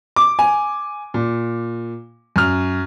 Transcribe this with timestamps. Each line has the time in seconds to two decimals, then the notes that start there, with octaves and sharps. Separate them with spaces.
0.16 D6
0.39 G#5
1.14 A#2
2.36 F#2 F6